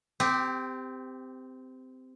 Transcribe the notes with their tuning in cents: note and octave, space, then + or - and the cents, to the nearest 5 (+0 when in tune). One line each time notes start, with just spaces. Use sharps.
C4 -20 G4 +15